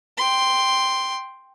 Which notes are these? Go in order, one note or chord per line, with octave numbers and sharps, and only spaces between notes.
G5 C6